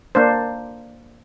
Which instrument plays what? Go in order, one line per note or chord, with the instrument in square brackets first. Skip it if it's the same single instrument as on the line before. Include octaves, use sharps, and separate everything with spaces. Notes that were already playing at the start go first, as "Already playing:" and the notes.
[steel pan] A#3 D4 C5